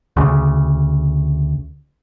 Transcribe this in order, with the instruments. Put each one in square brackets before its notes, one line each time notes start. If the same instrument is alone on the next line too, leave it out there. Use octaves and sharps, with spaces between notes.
[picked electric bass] D2 C#3